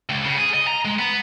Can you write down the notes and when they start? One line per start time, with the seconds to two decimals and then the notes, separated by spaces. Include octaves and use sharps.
0.09 C#2
0.25 C#3
0.37 G#4
0.54 D#5
0.67 A#5
0.85 G#3
0.99 B3